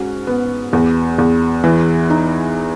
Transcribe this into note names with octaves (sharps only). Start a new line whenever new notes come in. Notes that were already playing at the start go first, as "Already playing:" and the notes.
Already playing: G#2 C#4 F#4
B3
E2
E2
E3
D#4